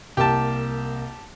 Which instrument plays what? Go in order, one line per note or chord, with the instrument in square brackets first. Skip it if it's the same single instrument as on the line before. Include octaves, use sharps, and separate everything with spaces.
[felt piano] C2 A#3 [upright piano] G4 A5